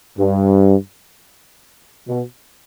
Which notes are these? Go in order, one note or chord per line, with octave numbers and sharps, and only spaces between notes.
G2
B2